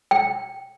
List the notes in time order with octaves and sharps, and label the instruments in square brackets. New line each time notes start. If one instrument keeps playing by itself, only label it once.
[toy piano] G5